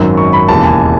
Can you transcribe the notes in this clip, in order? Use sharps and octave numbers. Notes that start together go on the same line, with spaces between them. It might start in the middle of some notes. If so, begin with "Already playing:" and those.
Already playing: G#1 F#2 D#3 F#3
C#6
B5
E1 D#2 C#3 E3 A5
G#5